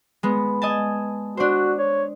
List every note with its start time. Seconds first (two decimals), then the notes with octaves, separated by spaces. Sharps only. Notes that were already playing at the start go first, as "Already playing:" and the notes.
0.23 G#3 B3
0.62 D#5 G#5 A5
1.37 D4 F#4 C5
1.79 C#5